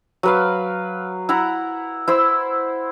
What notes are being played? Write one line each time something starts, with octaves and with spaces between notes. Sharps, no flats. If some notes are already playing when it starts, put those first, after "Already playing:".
F#3 B4 F5
E4 F#5 A#5
E4 C5 E6